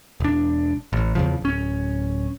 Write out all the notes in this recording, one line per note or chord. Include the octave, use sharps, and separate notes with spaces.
E1 D4
A1
E2 C#3 F3
D1 C#4